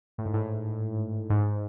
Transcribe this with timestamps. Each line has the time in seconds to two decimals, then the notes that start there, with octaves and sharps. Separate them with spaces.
0.18 A2
0.25 G#2
0.34 A2
1.30 G#2